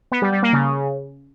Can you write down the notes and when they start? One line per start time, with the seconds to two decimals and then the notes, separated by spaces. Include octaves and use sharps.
0.12 B3
0.22 G3
0.32 G3
0.43 A#3
0.53 C#3